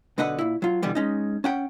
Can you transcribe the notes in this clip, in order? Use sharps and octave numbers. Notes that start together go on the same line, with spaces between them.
B1 B2 D3 B4 D#5 F#5
A#2 E4
F#3 F4
B2 D3 E3 G3 B3
G#3 C#4 D#4
C#4 F#5 G5